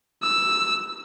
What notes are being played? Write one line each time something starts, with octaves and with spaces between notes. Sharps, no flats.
E6